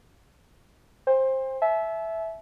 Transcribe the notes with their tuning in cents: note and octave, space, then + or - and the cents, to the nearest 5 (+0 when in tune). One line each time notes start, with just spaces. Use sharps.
C5 +15 G5 +40
E5 -5 A5 -45